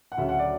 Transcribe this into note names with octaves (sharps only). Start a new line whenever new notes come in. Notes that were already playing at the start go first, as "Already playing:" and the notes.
F#5
D2 C#3 F#3 E5
F#5
D5